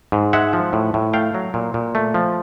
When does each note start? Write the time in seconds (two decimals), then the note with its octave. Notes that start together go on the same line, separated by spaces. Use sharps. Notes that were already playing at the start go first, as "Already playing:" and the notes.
0.12 G#2
0.33 G#3 E5 F#5
0.53 F3
0.73 A2
0.94 A2
1.13 A3 F5 G5
1.34 F#3
1.54 A#2
1.74 A#2
1.95 A3
2.14 F3